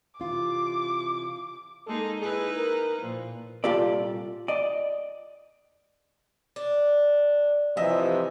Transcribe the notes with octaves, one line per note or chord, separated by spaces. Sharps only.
C3 E3 F4 D6
G#3 A#3 D#4 A4
D#4 E4 G#4 B4
A#4
A#2 F3
C2 A#2 F4 G4 A4 D5
D5 D#5
D4
C3 E3 F3 D#5 E5